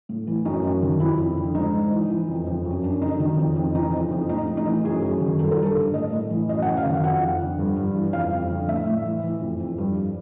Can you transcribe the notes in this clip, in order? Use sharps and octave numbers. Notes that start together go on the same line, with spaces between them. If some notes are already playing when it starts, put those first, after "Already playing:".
A2
E3
F#2 D#4
F#2
D#3
F2 E4
F2
D3
G#2 D#4
G#2
E3
E3
F2
F2
F#2
F#2 D4
D3 D#4
D#3 D#4
F2
F2
E3 D#4
F2
F2
A2 D#4
A2
D#4
E3
F#2 G#4
F#2
D#3
G2 A4
A#4
G2 A4
D3
A2 D#5
A2
E3
F#2 D#5
F#5
F#2
F5
D#3 F#5
F2 F#5
F2
D3
G2
G2
E3
F2 F5
F2
D3
A2 E5
A2
E3
E3
F2
F2
G2